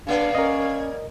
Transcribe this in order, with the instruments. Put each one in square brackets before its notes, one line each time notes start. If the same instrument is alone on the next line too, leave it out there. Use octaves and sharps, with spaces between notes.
[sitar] C#3 A#3 D5 [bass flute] D4 [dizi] F5
[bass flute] C#4 [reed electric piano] A#4 D#5